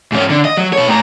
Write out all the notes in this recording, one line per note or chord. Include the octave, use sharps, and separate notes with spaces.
G#2 C#4
D3
D#5
F#3
B2 C#5
A2 A#5